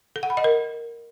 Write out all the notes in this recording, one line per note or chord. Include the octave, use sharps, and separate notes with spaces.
A4
F#5
B5
D#5
A#4